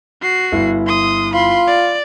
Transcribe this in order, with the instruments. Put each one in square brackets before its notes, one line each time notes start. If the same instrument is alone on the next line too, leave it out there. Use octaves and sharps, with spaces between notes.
[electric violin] F#4 C7
[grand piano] G1 E4
[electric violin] C6 D#6
[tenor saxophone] F4 [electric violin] B5 C6
[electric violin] D5